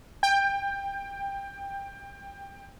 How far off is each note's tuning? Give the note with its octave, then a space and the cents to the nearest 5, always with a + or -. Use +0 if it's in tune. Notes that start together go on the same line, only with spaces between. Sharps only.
G5 +20